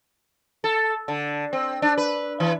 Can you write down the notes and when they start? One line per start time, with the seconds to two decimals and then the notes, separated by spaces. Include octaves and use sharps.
0.64 A4
1.08 D3
1.53 C4
1.82 D4
1.98 B4
2.40 E3